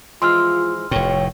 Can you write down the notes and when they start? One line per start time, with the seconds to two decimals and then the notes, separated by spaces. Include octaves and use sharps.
0.22 E3 F3 G#3 F4 C6 E6 F6
0.91 F1 A2 C#5 G5